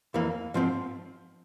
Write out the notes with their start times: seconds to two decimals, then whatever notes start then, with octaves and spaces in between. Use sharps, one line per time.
0.14 F2 E3 A#3
0.54 G#2 F3 C4